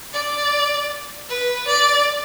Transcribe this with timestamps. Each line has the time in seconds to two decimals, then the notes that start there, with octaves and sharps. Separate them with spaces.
0.13 D5
1.29 B4
1.67 D5